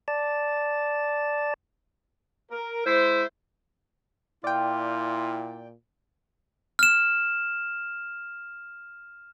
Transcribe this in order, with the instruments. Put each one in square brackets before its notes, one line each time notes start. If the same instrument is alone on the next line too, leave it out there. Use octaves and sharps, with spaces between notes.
[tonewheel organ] D5 A5
[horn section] A#4
G#3 E4 C5
[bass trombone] A#2 [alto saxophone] E4 [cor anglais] F4 [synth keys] D5 G5
[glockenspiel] F6 E7